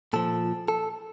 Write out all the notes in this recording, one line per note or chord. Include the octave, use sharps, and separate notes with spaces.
A#2 F3 A4
A4